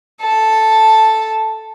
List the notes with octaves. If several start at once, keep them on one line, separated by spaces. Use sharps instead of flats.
A4 A5